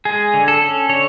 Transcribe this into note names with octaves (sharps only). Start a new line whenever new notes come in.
G#3 G#4
D3
A4
C#4
D3 C#5